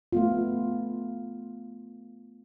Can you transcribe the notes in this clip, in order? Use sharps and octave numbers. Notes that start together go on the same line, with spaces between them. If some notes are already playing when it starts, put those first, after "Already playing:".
A3 B3 F4